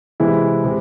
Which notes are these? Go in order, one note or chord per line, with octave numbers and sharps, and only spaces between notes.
C3 E3 G#3 E4
C3 G#3